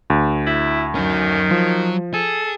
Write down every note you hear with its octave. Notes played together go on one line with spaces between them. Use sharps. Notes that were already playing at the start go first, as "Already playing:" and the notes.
D2
E4
D#3 F#3 C#4
F3 F#3
G#4 A4